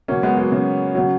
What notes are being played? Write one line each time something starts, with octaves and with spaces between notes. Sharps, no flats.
C#3 F#3 A#3 C#4
G#3 B3
F#3 A#3
C#3 F#3
C#3 F#3